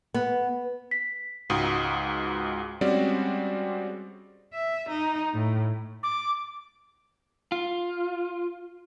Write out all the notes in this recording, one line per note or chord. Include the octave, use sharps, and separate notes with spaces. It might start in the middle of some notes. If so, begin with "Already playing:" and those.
B3
B6
C#2 G#2 F#4 D#6
G3 G#3 C4 C#4 F#4 D5
E5
D#4
A2
D6
F4